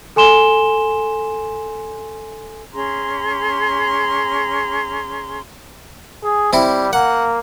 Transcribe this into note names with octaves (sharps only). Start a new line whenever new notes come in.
A4 G#5 C6 E7 G7
C#4 G#4 A#5 C6
G#4
G3 C4 E4
A#3 F#5